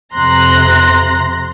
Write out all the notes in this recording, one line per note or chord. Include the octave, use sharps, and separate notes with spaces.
F2 C3 A#5 C6 F#6 A#6